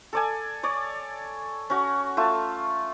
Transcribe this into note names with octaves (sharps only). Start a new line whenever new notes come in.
A4 D5 G#5
C#5 D5
C#4 F#4
A3 F4 A5